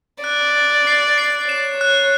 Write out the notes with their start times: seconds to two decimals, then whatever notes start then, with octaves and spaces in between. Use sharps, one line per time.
0.24 D5 F#6
0.56 A6
0.87 C7
1.18 C7
1.49 C#5 E7
1.81 F#6